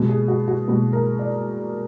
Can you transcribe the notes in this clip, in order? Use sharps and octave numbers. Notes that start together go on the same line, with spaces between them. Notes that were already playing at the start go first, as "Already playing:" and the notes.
Already playing: B2 G#3 B3
G#4
F#4
F#4
B2 G#3 B3
A#4
D5